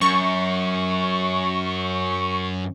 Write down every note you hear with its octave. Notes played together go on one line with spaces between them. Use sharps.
F#2 C#6